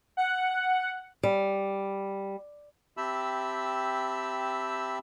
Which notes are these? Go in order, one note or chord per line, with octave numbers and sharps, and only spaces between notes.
F#5
G3
C4 G4 E5 A5 B5 E6